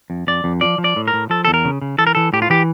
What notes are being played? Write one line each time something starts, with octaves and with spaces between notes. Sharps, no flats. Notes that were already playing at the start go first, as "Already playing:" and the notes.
F2
F2 D5
F2
F3 D5
F3
D5
A2
A#4
A2
F3 A4
E2 A4
A#4
C#3
C#3
E3 A4
A#4
E3 A4
A2 G4
F4
E3 G4